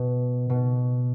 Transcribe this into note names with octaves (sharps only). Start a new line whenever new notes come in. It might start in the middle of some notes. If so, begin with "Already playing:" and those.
Already playing: B2
B2